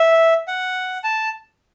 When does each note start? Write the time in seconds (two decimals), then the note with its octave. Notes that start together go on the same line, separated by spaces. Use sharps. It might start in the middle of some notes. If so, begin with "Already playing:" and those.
Already playing: E5
0.48 F#5
1.04 A5